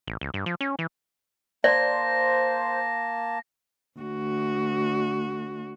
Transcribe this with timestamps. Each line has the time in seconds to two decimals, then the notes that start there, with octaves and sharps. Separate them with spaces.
0.07 A1
0.21 C#2
0.34 G2
0.46 F3
0.61 C#4
0.79 E3
1.64 A#3 C5 D5 A5 A#6
3.99 D2 F#4